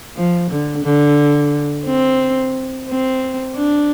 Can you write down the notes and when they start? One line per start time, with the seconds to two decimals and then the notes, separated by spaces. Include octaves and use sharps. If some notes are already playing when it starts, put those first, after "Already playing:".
0.16 F3
0.51 D3
0.84 D3
1.86 C4
2.89 C4
3.56 D4